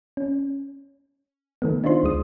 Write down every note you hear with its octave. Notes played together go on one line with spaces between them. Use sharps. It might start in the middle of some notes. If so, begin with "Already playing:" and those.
C#4
D#3 A3 B3
D4 D#4 F4 C5 C6
D2 G#3 D#6